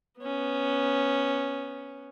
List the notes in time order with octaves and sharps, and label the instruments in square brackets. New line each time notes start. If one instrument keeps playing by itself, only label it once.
[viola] B3 C#4